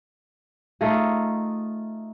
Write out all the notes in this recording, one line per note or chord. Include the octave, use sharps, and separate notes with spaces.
A3 D#4 F4 G#4